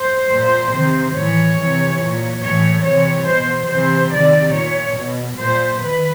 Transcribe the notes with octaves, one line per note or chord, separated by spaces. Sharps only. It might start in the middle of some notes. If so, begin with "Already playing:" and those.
Already playing: C5
A#2
C3 D#3
A2 E3 C#5
C3 E3
A#2
A2 E3 C#5
C3 E3 C#5
B2 C5
C3 E3 C5
C3 D#3 D5
A#2 C#5
B2
A#2 C5
D#3 B4